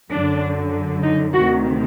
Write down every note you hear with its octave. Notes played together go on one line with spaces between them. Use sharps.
F#2 D3 F#3 D4
D#4
D2 C3 D#3 F#4